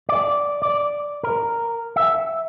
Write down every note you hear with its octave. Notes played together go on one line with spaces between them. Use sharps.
D5
D5
A#4
E5